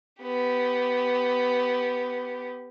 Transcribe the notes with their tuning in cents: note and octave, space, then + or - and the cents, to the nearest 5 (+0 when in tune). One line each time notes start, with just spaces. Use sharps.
B3 +10 G4 -5